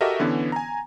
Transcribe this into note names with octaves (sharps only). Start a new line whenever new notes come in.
F#4 G4 A4 A#4 D#5 E5
D3 E3 B3 C#4
G#5 A#5